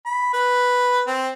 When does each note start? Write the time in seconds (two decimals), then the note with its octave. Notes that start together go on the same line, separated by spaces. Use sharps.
0.06 B5
0.34 B4
1.07 C4